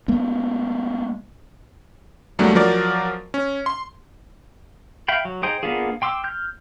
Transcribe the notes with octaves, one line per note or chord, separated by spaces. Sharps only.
G#3 A#3 B3
E2 F#3 G3 A3 A#3 D4
F3 F#3 A#4 D5
C#4
C6
E5 F5 G5 B5
F#3
D#4 G#4 C5 G5 D#6
A#3 B3 D4 F4 G#4
G5 C6 D6 E6
F6 G6